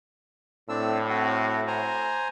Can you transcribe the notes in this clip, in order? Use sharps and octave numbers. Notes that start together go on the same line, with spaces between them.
A2 C4 D4 E6
C4 F#4
C5 G#5 A#5